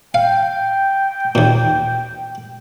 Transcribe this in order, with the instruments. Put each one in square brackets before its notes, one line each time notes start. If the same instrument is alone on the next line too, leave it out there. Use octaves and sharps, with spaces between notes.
[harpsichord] F5 [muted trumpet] G5
[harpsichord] D#2 A#2